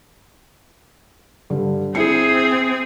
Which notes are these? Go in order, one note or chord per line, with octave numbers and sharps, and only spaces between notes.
G2 D3 G3
C4 E4 G#4 C7 C#7